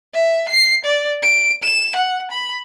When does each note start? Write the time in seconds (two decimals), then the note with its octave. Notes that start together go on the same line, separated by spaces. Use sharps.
0.14 E5
0.49 C7
0.85 D5
1.23 D7
1.63 E7
1.96 F#5
2.31 B5